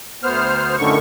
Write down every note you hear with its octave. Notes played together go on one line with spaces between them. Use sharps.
D2 B3 C5 F6
F#2 A2 D3 D#3 C#6